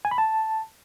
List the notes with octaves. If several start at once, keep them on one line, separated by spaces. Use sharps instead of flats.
G#5
B5
A5